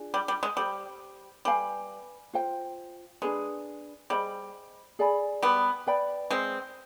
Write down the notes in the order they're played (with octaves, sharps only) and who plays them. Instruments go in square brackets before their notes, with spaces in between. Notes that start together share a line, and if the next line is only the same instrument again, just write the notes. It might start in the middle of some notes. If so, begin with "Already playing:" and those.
Already playing: [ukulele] D4 F4 G#4
[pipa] G3
G3
G#3
[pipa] G3 [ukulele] G4 C5 G5 B5
[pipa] G3 [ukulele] B4 F5 G#5
[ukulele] F4 C5 G5
[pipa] G#3 [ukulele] D4 G#4 B4
[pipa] G3 [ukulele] G#4 C5 D#5 B5
[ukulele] G#4 D5 G#5 B5
[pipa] G3 B3
[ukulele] B4 D5 G5 B5
[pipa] G#3 C4